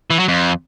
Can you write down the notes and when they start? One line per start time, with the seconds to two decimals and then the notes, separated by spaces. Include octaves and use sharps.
0.10 E3
0.19 F#3
0.28 F2